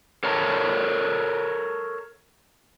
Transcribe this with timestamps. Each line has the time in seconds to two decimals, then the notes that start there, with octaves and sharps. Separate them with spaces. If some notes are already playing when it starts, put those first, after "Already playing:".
0.24 A4 A#4 C#5 A5 A#5